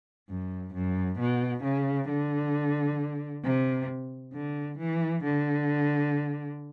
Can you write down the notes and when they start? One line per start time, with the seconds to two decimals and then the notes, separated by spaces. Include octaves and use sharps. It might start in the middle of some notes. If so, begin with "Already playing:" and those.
0.29 F#2
0.74 F#2
1.19 B2
1.63 C#3
2.08 D3
3.44 C3
4.34 D3
4.78 E3
5.24 D3